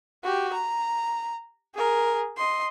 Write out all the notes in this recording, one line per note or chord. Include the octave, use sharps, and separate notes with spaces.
F#4 G4
A#5
G#4 A#4
D#5 C6